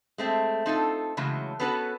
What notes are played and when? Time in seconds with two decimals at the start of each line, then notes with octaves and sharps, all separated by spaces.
0.18 G#3 A3 C4
0.66 C4 D#4 F4 A4
1.17 C#3 E3 F#3 G#3 A3
1.59 B3 C#4 F#4 A4 B4